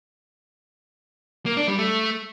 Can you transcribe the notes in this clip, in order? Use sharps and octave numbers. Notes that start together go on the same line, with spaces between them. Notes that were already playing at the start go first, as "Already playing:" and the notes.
A#3
D4
G3
A3